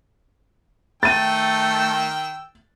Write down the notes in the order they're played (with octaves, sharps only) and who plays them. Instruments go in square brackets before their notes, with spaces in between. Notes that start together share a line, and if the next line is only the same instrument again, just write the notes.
[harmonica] D#3 G5 E6 [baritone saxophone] A3 [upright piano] A6 D#7